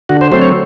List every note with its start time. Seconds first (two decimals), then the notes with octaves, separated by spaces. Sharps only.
0.09 D3 F#4
0.21 C5
0.32 F#3 A3 C4 C5
0.42 C#5